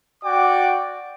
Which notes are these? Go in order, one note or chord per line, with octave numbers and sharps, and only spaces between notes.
F#4 D5 G5 D6